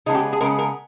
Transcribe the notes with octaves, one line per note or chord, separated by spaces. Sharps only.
C#3 G#3 B3 D#4
G4
G#4
C#3 G#3 B3 A#4
A#4